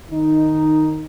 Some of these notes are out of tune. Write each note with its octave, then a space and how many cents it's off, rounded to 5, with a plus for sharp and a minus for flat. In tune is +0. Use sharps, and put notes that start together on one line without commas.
D#3 -15 D#4 +0